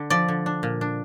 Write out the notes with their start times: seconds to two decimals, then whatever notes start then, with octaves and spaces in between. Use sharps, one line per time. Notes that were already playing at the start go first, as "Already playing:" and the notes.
Already playing: D3 D4
0.10 F3 D5
0.28 D3
0.46 D4
0.63 A#2
0.81 D4